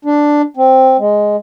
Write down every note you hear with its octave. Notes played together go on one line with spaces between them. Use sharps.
D4
C4
G#3